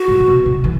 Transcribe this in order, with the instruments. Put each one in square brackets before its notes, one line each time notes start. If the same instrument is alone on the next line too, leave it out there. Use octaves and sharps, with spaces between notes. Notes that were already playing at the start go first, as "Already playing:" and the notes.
Already playing: [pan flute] F#4
[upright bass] A2
C3
B2
C3
E3